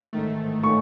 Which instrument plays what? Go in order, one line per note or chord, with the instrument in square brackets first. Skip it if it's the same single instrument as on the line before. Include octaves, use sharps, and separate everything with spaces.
[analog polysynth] A1 G#2 D#3 A3
[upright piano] C#6